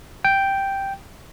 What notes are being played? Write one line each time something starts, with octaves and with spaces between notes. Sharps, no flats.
G5